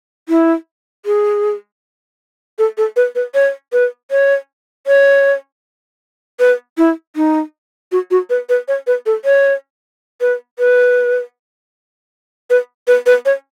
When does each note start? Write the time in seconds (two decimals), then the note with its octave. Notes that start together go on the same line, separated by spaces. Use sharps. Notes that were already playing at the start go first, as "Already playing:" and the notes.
0.29 E4
1.06 G#4
2.59 A4
2.78 A4
2.96 B4
3.15 B4
3.34 C#5
3.73 B4
4.11 C#5
4.87 C#5
6.40 B4
6.78 E4
7.16 D#4
7.92 F#4
8.11 F#4
8.30 B4
8.49 B4
8.68 C#5
8.87 B4
9.06 A4
9.25 C#5
10.21 B4
10.59 B4
12.50 B4
12.87 B4
13.06 B4
13.26 C#5